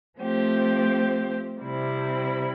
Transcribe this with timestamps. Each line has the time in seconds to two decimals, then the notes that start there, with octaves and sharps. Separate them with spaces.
0.19 F3 A3 C4 G4 C5
1.61 C3 G3 C4 E4